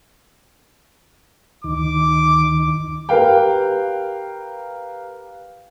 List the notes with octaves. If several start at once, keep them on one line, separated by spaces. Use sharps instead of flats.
D2 D#3 D6
G4 A#4 B4 F5 G5